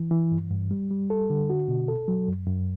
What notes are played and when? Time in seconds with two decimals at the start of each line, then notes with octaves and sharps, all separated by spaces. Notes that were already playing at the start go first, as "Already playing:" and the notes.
Already playing: E3
0.11 E3
0.31 G2
0.50 G2
0.71 G3
0.91 G3
1.10 A4
1.30 D3
1.50 F#4
1.68 B2
1.88 A4
2.08 F#3
2.28 F#2
2.47 F#2